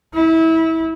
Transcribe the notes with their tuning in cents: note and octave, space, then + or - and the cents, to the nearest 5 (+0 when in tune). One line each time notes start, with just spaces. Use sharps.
E4 -25